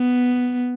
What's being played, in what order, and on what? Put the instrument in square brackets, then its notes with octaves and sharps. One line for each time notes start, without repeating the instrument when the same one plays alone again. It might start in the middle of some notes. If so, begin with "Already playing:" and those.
Already playing: [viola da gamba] B3